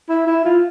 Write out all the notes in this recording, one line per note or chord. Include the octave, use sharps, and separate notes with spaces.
E4
E4
F4